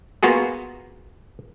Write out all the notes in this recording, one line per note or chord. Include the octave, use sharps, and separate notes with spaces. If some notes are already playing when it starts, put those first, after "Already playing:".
A#3 B3 F4 F#4 G#4